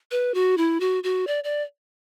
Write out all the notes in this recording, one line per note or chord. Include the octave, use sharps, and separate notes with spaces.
B4
F#4
E4
F#4
F#4
D5
D5